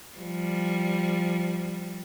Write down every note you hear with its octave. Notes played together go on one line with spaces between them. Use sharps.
F3 G3